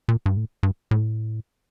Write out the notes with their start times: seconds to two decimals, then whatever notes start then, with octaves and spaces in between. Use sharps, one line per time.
0.08 A#2
0.26 G2
0.37 A2
0.63 G2
0.91 A2